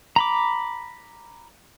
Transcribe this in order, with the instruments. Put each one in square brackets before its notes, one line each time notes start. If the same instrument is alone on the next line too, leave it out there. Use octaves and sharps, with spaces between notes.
[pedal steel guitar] A#5 B5 D6